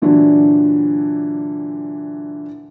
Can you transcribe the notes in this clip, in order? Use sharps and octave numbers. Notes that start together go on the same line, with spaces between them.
A#2 D3 E3 F#3 D4